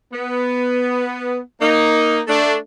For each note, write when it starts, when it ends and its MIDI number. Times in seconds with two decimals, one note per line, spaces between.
0.13 1.38 59
1.61 2.21 58
1.61 2.21 63
2.28 2.56 57
2.28 2.56 62